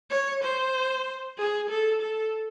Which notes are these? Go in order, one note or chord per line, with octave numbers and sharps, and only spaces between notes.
C#5
C5
G#4
A4
A4